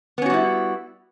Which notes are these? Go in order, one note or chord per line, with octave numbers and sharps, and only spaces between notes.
G3 B3 C#4 E4 F#4